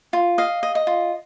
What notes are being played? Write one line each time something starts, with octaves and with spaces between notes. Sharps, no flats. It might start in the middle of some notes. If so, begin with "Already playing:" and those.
F4
D#5 F5
D#5
D#5
F4